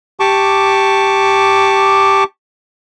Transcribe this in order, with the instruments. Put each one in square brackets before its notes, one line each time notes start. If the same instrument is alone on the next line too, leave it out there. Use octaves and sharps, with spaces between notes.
[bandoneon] G4 A5 C#6 D6